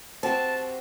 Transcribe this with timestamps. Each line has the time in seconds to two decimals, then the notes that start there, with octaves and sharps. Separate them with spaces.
0.23 C4 F#4 G4 A5